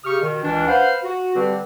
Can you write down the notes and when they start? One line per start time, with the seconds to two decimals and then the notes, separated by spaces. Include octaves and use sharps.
0.04 C#3 G4 C#6 D#6 F6
0.21 B2 D#3
0.43 C#2 E3 D4
0.68 B4 C5 F5 F#5
1.03 F#4
1.36 D3 G3 C4 G4 B4